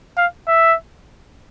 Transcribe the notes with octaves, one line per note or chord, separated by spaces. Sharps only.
F5
E5